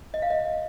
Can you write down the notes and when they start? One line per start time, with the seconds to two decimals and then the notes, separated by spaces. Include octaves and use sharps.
0.14 D#5
0.22 F5
0.30 D#5